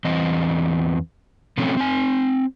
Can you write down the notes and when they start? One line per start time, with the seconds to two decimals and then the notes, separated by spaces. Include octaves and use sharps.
0.05 E2 E3 C4 D#5
1.58 B2 F3 F#3 A3 C4 C#4
1.77 C4 G#5